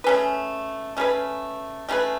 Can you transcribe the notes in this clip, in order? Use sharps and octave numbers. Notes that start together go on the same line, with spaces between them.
A3 C#4 G#4 B4
A3 C#4 G#4 B4
A3 C#4 G#4 B4